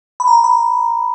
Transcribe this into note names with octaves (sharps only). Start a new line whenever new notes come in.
B5
A#5
B5